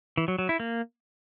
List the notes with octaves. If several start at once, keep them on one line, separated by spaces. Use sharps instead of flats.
E3
F#3
F#3
E4
A#3